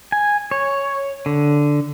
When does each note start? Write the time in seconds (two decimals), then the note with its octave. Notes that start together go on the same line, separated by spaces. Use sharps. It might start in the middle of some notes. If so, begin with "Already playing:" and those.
0.12 G#5
0.51 C#5
1.26 D3